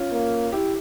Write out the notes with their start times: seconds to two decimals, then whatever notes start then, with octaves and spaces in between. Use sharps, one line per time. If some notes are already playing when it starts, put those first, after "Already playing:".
Already playing: C#4 F4
0.12 A#3
0.52 E4 G4